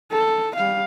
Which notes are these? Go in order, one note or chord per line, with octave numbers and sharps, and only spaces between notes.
A4
G3 F5